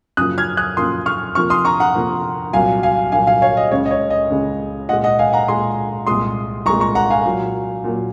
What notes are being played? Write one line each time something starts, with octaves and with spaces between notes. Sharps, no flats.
F#2 C#3 F3 A#3 D#6 F#6
F6 G#6
D#6 F#6
F#2 C#3 F3 A#3 C6 D#6
C#6 F6
F2 C3 F3 A#3 C#6 F6
C6 D#6
A#5 C#6
F#5 A#5
F2 C3 F3 A#3
C2 A#2 F#3 A#3 F5 G#5
F5 G#5
C2 A#2 F#3 A#3 F5 G#5
F5 G#5
C#5 F5
D#5
C#2 C#3 G#3 C#5
D#5
C#5
D#5
C#2 C#3 G#3
A#2 G#3 D#5 F#5
D#5 F#5
F5 G#5
F#5 A#5
A#2 G#3 G#5 C6
C2 A#2 G#3 C6 D#6
C2 A#2 G#3 A#5 C#6
A#5 C#6
F#5 A#5
F5 G#5
A#2 F#3 A#3
A#2 F#3 A#3